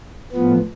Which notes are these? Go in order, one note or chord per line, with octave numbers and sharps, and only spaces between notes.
A2 F3 B3